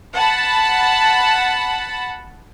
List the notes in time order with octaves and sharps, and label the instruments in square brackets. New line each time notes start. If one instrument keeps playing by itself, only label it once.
[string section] F#5 A5 B5